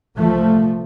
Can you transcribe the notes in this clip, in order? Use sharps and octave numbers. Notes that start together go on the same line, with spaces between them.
C2 A#2 F3 A3